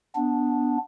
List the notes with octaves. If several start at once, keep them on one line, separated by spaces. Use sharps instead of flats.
B3 D4